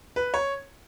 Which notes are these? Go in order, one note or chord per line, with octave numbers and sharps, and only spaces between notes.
B4
C#5